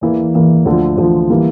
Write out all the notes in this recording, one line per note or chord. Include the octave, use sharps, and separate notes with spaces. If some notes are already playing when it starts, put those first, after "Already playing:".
E2 E3 A#3
E2 E3 A#3
D2 D3 F3
D2 D3 F3
E3 G3 A#3